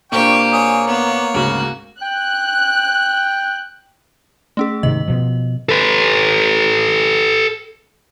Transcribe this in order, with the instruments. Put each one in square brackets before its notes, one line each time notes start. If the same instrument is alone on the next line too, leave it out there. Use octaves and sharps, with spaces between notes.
[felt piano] A#2 C4 D4 [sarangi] A#3 [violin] G4 [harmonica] G5 C#6
[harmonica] G#4 C#5 D#6
[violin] B3 [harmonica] C#5
[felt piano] D2 G#2 C#3 [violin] F#4
[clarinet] G5 [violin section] F#6
[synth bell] A3 C#4 G#4
[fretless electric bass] G#2 C3 D#3 [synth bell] D#5
[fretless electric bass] B2 F3
[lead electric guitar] A4 B4